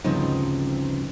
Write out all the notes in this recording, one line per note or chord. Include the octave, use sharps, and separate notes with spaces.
D2 G2 C#3 F3 C4 D#4